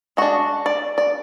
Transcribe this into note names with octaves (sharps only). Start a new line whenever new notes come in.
G#3 D4 F#4
D5
D5